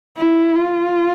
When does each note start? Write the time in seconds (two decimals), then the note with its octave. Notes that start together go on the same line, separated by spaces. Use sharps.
0.17 E4
0.56 F4